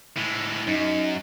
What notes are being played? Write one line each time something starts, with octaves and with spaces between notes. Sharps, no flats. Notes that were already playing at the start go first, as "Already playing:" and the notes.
A2 G#3
F#2 D#4